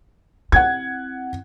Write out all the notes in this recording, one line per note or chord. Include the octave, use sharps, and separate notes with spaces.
C4 E4 F#5 G#6